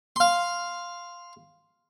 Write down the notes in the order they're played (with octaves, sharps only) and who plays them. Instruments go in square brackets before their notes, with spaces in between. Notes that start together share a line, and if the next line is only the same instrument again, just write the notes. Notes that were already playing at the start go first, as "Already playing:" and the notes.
[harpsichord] F5 C6